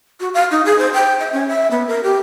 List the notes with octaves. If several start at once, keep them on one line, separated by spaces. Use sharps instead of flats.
F#4
F5
D#4
G#4
C5
G5
E5
C#4
E5
B3
A#4
G4